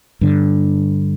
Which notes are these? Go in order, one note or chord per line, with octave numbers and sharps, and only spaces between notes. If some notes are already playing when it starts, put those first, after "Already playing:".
G2 D3